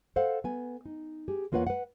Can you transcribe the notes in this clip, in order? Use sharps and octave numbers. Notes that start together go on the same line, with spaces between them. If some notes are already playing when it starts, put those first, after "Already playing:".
A4 C5 F5 F#5
B3 G#5
D#4
G4 G#4
E2 A#3 F4 B4 C#5 F#5
B4 F#5